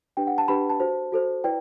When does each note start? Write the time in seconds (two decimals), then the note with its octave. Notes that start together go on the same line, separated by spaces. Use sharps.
0.17 D4 G4 B4 G5
0.27 F#5
0.38 A5
0.48 D4 G4 B4 B5
0.69 A5
0.80 F#4 A4 C5
1.12 F#4 A4 C5
1.44 E4 B4 D5 G5